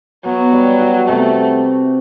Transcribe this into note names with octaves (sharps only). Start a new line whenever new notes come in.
F#3 B3
G3
F#4
C3 A3